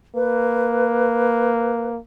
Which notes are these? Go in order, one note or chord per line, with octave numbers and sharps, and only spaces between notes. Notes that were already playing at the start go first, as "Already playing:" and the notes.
A#3 B4